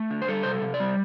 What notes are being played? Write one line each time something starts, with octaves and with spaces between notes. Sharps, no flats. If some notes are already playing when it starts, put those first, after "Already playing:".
Already playing: A3
D3
C5
G3 A4
C3 C5
A4
C3
D5
G3